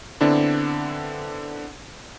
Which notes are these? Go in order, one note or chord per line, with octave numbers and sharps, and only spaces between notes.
D3 B3 C4 D4 E4